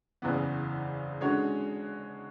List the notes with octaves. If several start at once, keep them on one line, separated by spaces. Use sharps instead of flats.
F#1 E2 C#3 E3 B3
D3 G#3 C#4 F#4 C#5